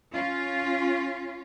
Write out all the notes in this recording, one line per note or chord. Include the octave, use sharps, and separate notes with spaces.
C#4 F4